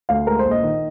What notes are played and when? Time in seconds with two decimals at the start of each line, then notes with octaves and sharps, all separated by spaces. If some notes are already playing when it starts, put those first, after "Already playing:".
0.09 D2 F5
0.27 G#3 A#4
0.39 C5
0.45 A#1
0.51 D#5
0.63 D#3